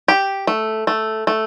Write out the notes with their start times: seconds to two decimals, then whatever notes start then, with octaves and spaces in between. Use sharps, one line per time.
0.08 G4
0.47 A3
0.87 A3
1.27 A3